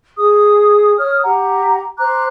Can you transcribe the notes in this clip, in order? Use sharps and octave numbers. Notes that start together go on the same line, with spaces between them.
G#4 D#6
C#5 D#6 F6
G4 F#5 A#5
C5 A#5 D6 F#6